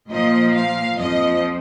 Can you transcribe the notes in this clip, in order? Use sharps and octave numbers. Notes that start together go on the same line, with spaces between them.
A#2 F3 D#5
F5
F2 F3 D#5